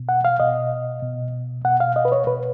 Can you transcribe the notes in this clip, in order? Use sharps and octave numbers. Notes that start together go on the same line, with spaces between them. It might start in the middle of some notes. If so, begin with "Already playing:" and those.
Already playing: B2
F#5
F5
B2 D#5
B2
B2 F#5
F5
D#5
B4
C#5
B2 B4